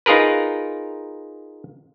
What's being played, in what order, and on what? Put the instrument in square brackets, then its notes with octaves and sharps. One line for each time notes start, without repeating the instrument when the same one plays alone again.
[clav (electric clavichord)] D#4 F4 G#4 A#4 B4